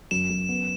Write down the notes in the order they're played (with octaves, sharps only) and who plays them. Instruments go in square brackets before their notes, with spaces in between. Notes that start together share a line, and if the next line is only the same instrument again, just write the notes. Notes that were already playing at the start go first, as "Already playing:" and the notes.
[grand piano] F#2 [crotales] E7
[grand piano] F#2
B3